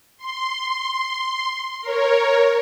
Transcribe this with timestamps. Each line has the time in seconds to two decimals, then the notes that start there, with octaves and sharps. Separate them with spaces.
0.18 C6
1.81 A#4 C#5